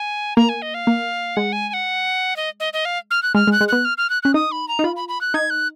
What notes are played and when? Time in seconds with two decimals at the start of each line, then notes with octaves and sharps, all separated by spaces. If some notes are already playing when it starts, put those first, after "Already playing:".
Already playing: G#5
0.36 A#3 A#5
0.49 G#5
0.62 D#5
0.74 F5
0.87 A#3
1.36 G#3 F#5
1.53 G#5
1.69 G#5
1.74 F#5
2.36 D#5
2.60 D#5
2.73 D#5
2.85 F5
3.11 F6
3.23 F#6
3.35 G#3 F6
3.47 G#3
3.52 F#6
3.61 G#3
3.68 B3 F#6
3.85 F6
3.98 F6
4.10 F#6
4.23 C#4 F#6
4.34 D#4 D#6
4.52 B5
4.68 A#5
4.79 D#4
4.84 F4 B5
4.96 B5
5.09 B5
5.21 F#6
5.34 D#4 G#6
5.50 F#6